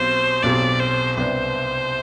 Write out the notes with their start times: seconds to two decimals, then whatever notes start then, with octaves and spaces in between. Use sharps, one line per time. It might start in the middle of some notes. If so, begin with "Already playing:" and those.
Already playing: B1 B2 F#3 C4 G4 C5
0.43 B1 B2 F#3 C4 G4 D5
0.80 C5
1.17 C2 C3 G3 B3 D4 C5